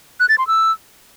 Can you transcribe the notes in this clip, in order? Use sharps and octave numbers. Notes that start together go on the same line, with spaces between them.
F#6
A6
C6
E6